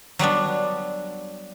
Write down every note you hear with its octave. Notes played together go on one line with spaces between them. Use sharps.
F#3 G3 B3 D4